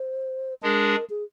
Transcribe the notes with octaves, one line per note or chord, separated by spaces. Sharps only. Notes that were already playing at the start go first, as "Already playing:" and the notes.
Already playing: C5
G#3 D4 G#4 A#4
G#4